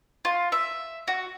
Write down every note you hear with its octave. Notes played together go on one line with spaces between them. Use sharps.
F4
E5
F#4